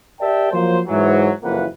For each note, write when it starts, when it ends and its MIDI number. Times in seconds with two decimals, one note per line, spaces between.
0.20 0.49 67
0.20 0.49 70
0.20 0.49 74
0.20 0.49 76
0.20 0.49 79
0.20 0.49 81
0.52 0.79 53
0.52 0.79 54
0.52 0.79 58
0.52 0.79 72
0.88 1.31 44
0.88 1.31 52
0.88 1.31 54
1.43 1.65 30
1.43 1.65 41
1.43 1.65 52
1.43 1.65 58
1.43 1.65 71
1.43 1.65 78